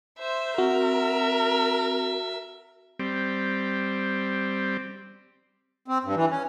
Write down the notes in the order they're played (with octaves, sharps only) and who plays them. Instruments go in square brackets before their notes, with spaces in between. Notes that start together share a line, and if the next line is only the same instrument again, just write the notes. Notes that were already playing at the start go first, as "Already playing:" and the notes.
[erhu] C5 [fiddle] E5
[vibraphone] C4 [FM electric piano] F#4 [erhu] A#4
[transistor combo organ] G3 C4
[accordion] C4
G2
E3
C#4